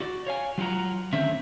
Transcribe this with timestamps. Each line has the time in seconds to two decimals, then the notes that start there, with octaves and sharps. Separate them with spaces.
0.01 F#4 D5
0.27 C#5 F5 G#5
0.58 F#3 F4 F#4 F#5 A#5
1.13 D3 D#3 A3 C4 C#4 E5